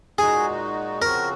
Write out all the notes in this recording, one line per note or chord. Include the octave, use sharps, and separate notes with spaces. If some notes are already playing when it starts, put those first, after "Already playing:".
A#2 G#3 D#4 F#4 G#4
C#3 F3 C4 F#4 A#4